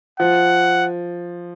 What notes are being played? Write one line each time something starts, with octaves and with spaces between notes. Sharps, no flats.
F3 F#5